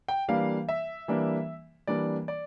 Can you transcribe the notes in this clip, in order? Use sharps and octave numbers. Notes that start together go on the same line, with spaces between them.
G5
E3 G3 A#3 D4 F5
E5
E3 G3 A#3 D4
E3 G3 A#3 D4 D5
D5